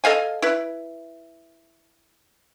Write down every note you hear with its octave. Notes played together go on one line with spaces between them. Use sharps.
A4 D#5 F5 G#5
E4 B4